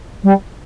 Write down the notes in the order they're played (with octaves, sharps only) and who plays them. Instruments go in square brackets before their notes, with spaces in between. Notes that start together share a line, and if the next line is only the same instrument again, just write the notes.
[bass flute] G3